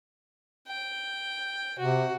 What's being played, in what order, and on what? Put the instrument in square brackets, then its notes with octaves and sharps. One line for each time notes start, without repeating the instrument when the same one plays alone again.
[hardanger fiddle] G5
[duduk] C3 [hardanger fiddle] F#4